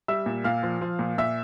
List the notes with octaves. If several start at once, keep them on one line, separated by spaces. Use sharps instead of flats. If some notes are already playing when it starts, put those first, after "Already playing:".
G3 E5 E6
A#2
A#2 F5 F6
F3
F3
A#2
A#2 E5 E6